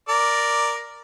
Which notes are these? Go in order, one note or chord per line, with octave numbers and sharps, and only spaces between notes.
A#4 D5